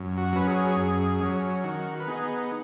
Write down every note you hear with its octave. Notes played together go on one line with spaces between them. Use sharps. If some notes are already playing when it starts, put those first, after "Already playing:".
Already playing: F#2
F#4
F#3 C#4 B4
G#4
F#2
F#3 C#4
D#3 F#4
B4
B3 D#4 G#4